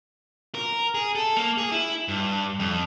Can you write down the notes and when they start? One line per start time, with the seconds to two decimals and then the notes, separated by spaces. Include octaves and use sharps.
0.55 A#4
0.95 G#4
1.15 A4
1.37 A#3
1.58 G#4
1.72 E4
2.08 G2
2.59 F2